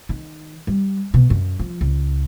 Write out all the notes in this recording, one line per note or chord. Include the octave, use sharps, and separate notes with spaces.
D#3
G3
B2
F#2
F3
C#2